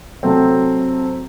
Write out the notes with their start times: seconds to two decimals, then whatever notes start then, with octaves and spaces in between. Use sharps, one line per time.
0.23 C3 F#3 A3 C4